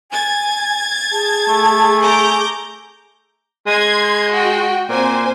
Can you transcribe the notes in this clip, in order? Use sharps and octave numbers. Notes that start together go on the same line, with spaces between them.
G#5 G#6 A6
G#4 A5
A3
G#5 A#5 D6 G6
G#3 C6 G#6
F#4 G5
A#2 C4 C5 G#5